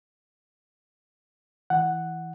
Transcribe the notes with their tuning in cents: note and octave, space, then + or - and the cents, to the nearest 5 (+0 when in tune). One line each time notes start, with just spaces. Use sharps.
E3 -10 F#5 +0